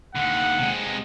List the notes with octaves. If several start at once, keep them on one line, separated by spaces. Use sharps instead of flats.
D#2 D3 F#5
C3 G#3